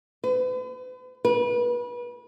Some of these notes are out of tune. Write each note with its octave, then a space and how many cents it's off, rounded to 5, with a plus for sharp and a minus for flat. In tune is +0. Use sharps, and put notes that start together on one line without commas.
B4 +40
B4 -30